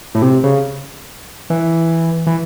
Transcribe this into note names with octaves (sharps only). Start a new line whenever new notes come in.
A2
C3
C#3
E3
E3